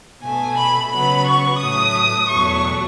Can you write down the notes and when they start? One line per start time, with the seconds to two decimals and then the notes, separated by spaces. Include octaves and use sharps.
0.22 B2 A3 G#5
0.57 B5
0.91 C#3 F#3 B3 B5
1.26 C#6
1.59 A2 F#3 A3 D#6
2.29 E2 B2 F#3 A3 C#6